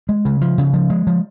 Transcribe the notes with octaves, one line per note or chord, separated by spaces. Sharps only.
G#3
C#3
F3
C#3
F3
G#3
F3